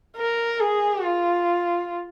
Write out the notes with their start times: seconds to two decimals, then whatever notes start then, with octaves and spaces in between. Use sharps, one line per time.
0.17 A#4
0.61 G#4
1.04 F4